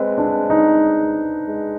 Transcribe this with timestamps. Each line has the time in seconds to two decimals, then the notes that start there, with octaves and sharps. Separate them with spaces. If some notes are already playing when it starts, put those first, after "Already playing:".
Already playing: G#3 C4 B4
0.18 D4
0.50 D#4
1.48 G#3